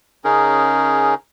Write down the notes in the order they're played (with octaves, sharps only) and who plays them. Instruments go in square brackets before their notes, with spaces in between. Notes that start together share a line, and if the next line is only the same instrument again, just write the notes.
[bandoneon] C#3 C#4 D#4 G#4 A#4